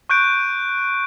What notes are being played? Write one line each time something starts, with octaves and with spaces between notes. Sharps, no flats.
C#6 F#6 G6 D7